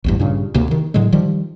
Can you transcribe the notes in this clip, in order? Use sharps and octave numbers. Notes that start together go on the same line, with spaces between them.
A1 E2 G2
G2 A#2 C#3
D2 C3 A#3
D#3
A2 D3 F#3 G#3
D#3 F3 G3